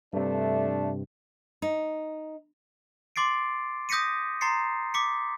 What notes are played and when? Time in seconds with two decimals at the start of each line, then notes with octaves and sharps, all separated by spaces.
0.13 G2 C3 A3 D4
1.62 D#4
3.16 C6 D6 A6 C7 D7
3.89 D#6 G6 A#6 B6 C#7 D#7
4.41 A#5 C6 A6 C7 C#7
4.94 D6 B6 C#7